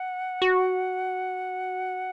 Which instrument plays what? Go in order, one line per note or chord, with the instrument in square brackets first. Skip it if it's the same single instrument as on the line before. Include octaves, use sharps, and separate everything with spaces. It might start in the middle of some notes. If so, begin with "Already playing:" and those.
Already playing: [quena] F#5
[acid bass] F#4